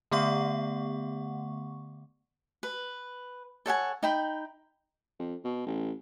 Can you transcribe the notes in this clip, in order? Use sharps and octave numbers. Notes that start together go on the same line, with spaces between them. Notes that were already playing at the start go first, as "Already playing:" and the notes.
D3 A3 B3 F#5 C#6
B4
A4 C#5 F#5 G#5
D#4 G5 B5
F2
B2
A1